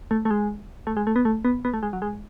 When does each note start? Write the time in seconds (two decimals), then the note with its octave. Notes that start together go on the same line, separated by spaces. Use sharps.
0.11 A3
0.25 A3
0.31 G#3
0.87 A3
0.97 G#3
1.07 A3
1.16 B3
1.25 A3
1.45 B3
1.65 B3
1.74 A3
1.83 G#3
1.93 F#3
2.02 G#3